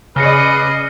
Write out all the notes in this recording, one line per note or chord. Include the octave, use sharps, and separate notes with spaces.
C#3 G#4 B4 D5 D#5 F6 A#6 C#7